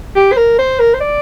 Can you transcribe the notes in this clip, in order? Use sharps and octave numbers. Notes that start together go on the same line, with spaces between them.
G4
C5
A#4
C5
A#4
C5
D5